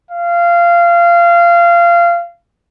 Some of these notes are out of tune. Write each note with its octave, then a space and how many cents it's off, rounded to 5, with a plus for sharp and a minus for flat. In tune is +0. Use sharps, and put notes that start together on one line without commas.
F5 -20